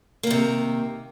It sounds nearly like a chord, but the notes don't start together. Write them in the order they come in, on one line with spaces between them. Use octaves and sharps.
A#3 D#3 C3